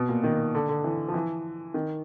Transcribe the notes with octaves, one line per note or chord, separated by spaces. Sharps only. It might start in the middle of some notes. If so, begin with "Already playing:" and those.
Already playing: B2
A#2
D#3
D3
D3
E3
F3
E3
D#3